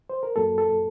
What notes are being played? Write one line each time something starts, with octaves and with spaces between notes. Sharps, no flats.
C5
A#4
F#2 F#3 A#3 A4
A4